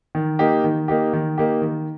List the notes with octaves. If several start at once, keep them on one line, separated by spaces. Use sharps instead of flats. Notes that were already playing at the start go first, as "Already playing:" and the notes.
D#3
A#3 D#4 G4
D#3
A#3 D#4 G4
D#3
A#3 D#4 G4
D#3